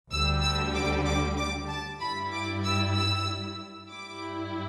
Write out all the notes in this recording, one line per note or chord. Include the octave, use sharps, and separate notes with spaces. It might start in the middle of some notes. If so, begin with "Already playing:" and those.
D2 D3 G3 E6
E6
D6
D6
D6
A5
G2 G3 E4 B5
D6
E6
E6
G2 G3 E4 D6